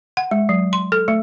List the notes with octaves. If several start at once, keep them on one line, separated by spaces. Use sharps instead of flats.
F#5
G#3
F#3
C6
A4
A3